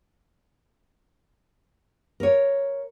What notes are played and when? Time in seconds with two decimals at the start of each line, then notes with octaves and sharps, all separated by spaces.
2.20 A#4 C#5